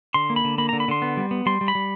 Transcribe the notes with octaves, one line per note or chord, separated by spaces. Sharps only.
D3 C6
A#3
B5
D3
A#3 B5
D3 A#5
B5
D3 C6
B3
G3
B3
G3 C6
G3
B5
G3